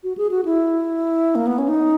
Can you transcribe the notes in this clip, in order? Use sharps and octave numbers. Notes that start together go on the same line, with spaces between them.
F#4
G#4
F#4
E4
A#3
B3
C#4
D#4